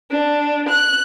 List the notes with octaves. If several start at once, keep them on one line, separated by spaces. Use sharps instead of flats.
D4
F#6